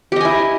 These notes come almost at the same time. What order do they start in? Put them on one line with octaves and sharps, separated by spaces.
G4 D#5 G#5 E4